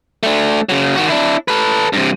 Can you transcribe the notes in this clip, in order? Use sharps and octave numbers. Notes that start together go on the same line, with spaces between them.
A3 D4
C#3 F#3
D#3 F#4
D4 E4
A4 B4
G2 C3